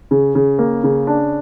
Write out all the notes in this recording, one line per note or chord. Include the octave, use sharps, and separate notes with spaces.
C#3
C#3
A#3
C#3
D4